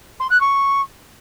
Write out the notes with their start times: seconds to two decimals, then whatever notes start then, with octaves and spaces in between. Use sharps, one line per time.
0.19 C6
0.30 F#6
0.40 C#6